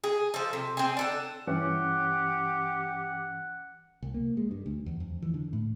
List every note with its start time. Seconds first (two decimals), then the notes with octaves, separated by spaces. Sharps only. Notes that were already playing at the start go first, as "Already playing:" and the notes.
0.04 G#4
0.34 F3 A4
0.53 C3
0.77 C4 G#4
0.97 D4 A4 F#5
1.47 G2 E3 C#4 G4 F#5
4.03 C2
4.14 A#3
4.37 G#3
4.51 G2
4.66 D2
4.86 E2
5.00 F2
5.22 E3
5.34 D3
5.53 A2